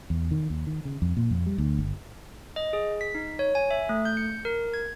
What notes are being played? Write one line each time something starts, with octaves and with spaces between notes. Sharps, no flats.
E2
D#3
D#2
D#3
C#3
F2
A#2
F2
G3
D2
G1
D#5
G#4
B6
D#4
C#5
G#5
E5
A3
G6
C#7
A#4
G#6